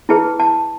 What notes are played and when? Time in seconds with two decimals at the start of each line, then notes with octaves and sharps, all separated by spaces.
0.09 E4 G#4 B4 A5
0.40 A5